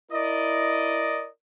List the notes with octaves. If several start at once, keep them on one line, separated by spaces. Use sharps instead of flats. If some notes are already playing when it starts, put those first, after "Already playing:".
E4 A#4 D5 D#5